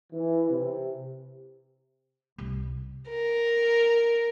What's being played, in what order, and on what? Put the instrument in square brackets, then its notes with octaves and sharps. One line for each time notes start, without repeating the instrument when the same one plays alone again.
[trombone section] E3
C3
[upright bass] C2
[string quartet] A#4